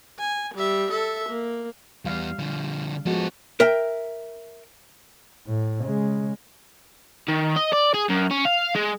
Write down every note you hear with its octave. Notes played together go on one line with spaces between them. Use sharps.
G#5
G3 E5
A4 E5
A#3
E2 G3 B3 F5
D3 F3
F3 G#3 B3 F#4 A4
A#4 E5 G5
A2
C#3 G#3
D#3
D#5
D5
G#4
F#2
C#4
F5
G#3